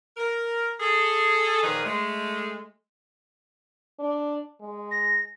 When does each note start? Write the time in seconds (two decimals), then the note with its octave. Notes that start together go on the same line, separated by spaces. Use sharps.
0.17 A#4
0.80 G#4 A4
1.63 A#2 D#3 F3 G#4 A#4 B4
1.85 G#3 A3
3.99 D4
4.61 G#3
4.91 A#6